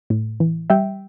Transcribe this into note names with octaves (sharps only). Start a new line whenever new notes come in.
A2
E3
G3 E5 G5